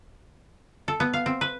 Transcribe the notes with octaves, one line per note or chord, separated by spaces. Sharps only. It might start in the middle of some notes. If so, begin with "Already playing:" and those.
A4
B3
F5
C4
B4